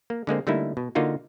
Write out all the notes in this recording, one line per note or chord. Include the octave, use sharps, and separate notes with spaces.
A#3
D3 G#3 A#3 C4
D3 G3 A3 A#3 D#4 E4
B2
D3 A#3 D#4 F4 F#4